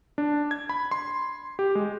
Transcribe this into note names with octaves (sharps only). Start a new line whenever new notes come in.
D4
G#6
B5
C6
G4
G#3